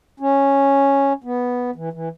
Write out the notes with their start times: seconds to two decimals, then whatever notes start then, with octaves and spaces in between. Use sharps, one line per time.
0.20 C#4
1.24 B3
1.76 E3
1.93 E3